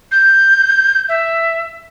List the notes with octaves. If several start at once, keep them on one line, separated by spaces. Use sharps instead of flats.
G6
E5